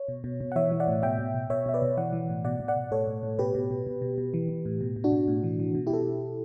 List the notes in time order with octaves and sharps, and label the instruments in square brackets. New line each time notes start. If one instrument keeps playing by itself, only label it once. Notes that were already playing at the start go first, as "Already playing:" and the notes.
Already playing: [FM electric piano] C#5
B2
B2
B2
F#5
E3 C#5 E5
E3
D5 F#5
A2
B2 E5 G5
B2
B2
B2 C#5 E5
B2 E5
B4 D5
B2
E3 D5 F#5
E3
A2
B2 D5 F#5
B2
D5 F#5
B2
A2 A4 C#5
A2
A2
B2 G4 B4
B2
B2
B2
B2
B2
E3
E3
A2
B2
B2
D4 F#4
B2
A2
E3
E3
B2
E4 G4
B2 A4